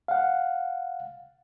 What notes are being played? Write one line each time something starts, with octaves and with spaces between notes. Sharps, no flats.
F5 F#5